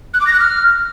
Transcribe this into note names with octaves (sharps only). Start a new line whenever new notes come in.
F#6
D6
A#6
F#6
F6